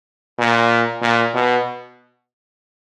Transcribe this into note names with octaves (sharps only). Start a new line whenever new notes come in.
A#2
A#2
B2